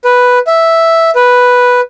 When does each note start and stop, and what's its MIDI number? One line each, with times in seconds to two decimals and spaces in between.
0.05 0.39 71
0.47 1.10 76
1.15 1.81 71